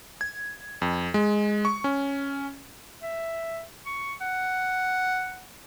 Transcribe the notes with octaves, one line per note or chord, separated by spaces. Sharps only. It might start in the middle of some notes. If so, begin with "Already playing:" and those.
G#6
F2
G#3
C#6
C#4
E5
C#6
F#5